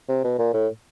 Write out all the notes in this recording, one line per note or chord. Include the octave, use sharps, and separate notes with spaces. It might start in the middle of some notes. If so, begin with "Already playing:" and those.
C3
B2
A#2
A2